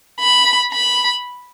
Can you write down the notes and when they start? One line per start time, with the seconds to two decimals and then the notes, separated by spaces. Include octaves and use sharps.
0.20 B5
0.72 B5